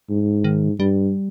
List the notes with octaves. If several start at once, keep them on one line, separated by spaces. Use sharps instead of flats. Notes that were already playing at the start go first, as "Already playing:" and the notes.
G#2
D#3
G2 G3